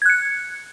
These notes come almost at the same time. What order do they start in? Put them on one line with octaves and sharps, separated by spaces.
G#6 F#6 C#7